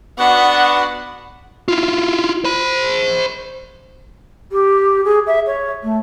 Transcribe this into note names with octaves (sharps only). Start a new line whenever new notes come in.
B3 D4 F#4 F#5 B5
E4 F4
C5 B5
G4
G#4
E5
C#5
A3